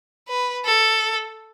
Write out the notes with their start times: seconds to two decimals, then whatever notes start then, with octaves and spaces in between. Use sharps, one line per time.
0.28 B4
0.65 A4